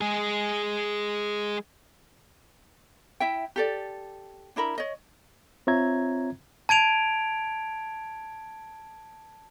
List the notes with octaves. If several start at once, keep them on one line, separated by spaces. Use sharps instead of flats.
G#3 G#4
E4 E5 G5
G4 A4 D5
D4 E4 A#4 B5
C#5 D#5
C4 F4 C#5 E5 A#5 G#6
A5 G#6 D7 F7